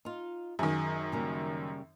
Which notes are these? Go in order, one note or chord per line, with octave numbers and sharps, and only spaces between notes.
D#4 F4
F#2 D#3 G#4
C#3 G3 A#3